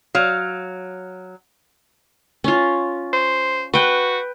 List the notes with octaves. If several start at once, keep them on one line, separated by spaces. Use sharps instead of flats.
F#3 F5
C#4 F4
C5
F#4 B4 G5